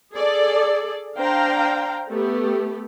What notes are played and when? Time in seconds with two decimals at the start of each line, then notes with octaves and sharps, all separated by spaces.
0.13 G#4 A4 D5
1.17 D4 C5 F5 G5 A#5
2.09 A3 B3 G4